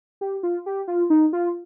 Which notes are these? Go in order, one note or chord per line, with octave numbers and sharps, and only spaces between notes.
G4
F4
G4
F4
D#4
F4